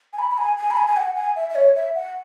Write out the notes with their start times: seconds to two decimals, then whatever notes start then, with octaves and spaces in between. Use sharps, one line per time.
0.13 G#5
0.19 B5
0.30 B5
0.38 G#5
0.58 G#5
0.71 B5
0.77 G#5
0.87 G#5
0.97 F#5
1.16 G#5
1.36 E5
1.50 E5
1.55 C#5
1.76 E5
1.95 F#5